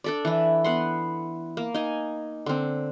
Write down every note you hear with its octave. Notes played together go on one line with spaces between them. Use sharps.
D4 A4 D5
E3 E4
B3 F#5 C6
A#3
D#4 G#5
D3 C4